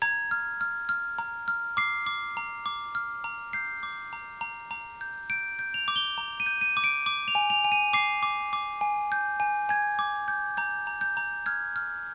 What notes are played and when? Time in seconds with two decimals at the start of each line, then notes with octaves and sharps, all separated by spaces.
0.02 A#5 G#6
0.31 F6
0.61 F6
0.89 F6
1.18 A#5
1.48 F6
1.77 D6 C7
2.06 D6
2.37 A#5
2.66 D6
2.95 F6
3.24 A#5
3.53 G6 C7
3.83 D6
4.13 A#5
4.41 A#5
4.71 A#5
5.01 G6
5.30 G6 D7
5.59 G6
5.74 F7
5.88 D6
5.96 G7
6.18 A#5
6.40 D#7
6.46 G6
6.61 D#7
6.77 D6
6.84 D7
7.06 D6
7.28 F7
7.35 G#5
7.50 F7
7.64 G#5
7.72 D#7
7.93 D6 C7
8.23 D6
8.53 D6
8.81 G#5
9.12 G6
9.40 G#5
9.69 G#5 G#6
9.99 D6
10.28 G6
10.57 A#5 G6
10.87 A#5
11.01 G6
11.17 A#5
11.46 F6 G#6
11.76 F6